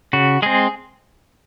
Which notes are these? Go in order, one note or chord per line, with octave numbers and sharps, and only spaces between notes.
C#3 F#4
G#3 C4 G#4